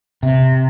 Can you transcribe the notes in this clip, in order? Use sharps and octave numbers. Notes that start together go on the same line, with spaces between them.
C3